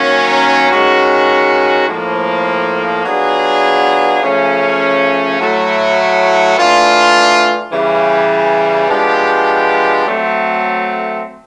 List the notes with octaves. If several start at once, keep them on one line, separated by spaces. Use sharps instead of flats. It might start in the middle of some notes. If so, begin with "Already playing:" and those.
Already playing: D#3 F#3 A#3 C#4
D#3 G#3 C#4 F#4
A2 F3 A#3
F#3 B3 D4 F4 G#4
C#3 F3 A3 C#4
A2 F#3 A3
E3 A3 D4 F4
C#3 E3 G3
F3 G#3 B3 D4 G4
F#3 A3 C4